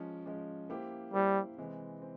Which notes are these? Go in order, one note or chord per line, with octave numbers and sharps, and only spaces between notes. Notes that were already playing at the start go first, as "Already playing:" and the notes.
Already playing: F3 G#3 C#4
F3 G#3 C#4
A#3 E4 G4 C5
G3 A#3 E4 G4 C5
C3 E3 G#3 C4
C4